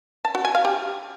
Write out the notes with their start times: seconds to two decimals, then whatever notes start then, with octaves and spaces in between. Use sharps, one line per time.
0.25 A5
0.35 F#4
0.45 G#5
0.55 F5
0.65 G4